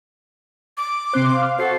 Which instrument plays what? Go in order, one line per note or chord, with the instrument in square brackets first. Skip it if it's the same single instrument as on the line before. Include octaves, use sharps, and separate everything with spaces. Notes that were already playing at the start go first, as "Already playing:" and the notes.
[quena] D6
[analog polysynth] C3 C4 C6 [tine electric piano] C5 F#6
[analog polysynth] F5
[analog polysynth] F#4 [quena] A4 [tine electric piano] C5 C7